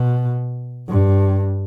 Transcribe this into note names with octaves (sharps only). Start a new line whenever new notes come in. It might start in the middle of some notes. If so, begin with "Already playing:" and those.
Already playing: B2
G2